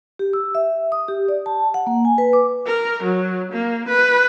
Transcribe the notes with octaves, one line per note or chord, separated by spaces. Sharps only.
G4
E6
E5
D#6
G4
D5
A5
F#5
A#3
G#5
B4
D6
A#4
F#3
A#3
B4